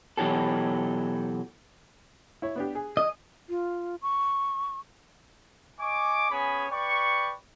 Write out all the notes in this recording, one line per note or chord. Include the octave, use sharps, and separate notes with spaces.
B2 E3 F#3 G4 A4
E4 C#5
B3 D4 G4
G#4
D#5
F4
C#6
D#5 G#5 C#6 D6
B3 C#4 G#4 C#5 G#5 B5
B4 D5 G5 C#6